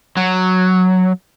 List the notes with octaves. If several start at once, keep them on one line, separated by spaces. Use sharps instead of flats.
F#3